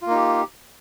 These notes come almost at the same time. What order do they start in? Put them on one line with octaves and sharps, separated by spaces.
F4 A#3 D#4 G4